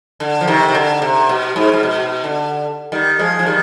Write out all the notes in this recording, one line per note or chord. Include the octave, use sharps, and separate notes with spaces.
D3
F3
C3 D#3
C3
D3
C3
B2
G#2
G#2
B2
D3
D#3 G3
F3 G#3
F3
D#3 G3